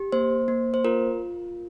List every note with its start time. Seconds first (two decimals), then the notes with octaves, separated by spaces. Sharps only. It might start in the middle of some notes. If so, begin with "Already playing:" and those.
Already playing: G4
0.12 A#3 C5
0.48 A#3
0.74 C5
0.85 F4 A#4